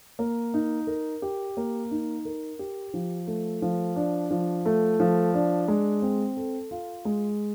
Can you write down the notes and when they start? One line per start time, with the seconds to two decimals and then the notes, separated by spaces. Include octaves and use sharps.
0.19 A#3
0.54 D#4
0.87 A#4
1.22 G4
1.57 A#3
1.91 D#4
2.25 A#4
2.59 G4
2.94 F3
3.27 A3
3.62 F3
3.96 D4
4.31 F3
4.66 A3
5.00 F3
5.34 D4
5.68 G#3
6.02 C4
6.37 A4
6.71 F4
7.05 G#3